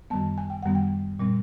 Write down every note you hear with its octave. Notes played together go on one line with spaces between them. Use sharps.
F#2 D#3 G3 B3 A5
G#5
G5
F#2 D#3 G3 B3 F#5
G5
A#2 G3 C4